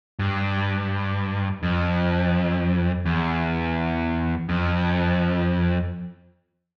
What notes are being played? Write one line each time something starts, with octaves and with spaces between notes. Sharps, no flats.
G2
F2
E2
F2